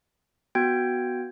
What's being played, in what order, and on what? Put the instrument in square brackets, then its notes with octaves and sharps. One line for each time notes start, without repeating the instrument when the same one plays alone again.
[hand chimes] B3 F#4 G5 G6 G#6 D7